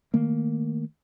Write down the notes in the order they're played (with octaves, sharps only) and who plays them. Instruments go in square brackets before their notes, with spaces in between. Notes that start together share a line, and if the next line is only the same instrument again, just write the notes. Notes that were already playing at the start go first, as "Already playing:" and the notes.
[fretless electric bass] D#3 A3 A#3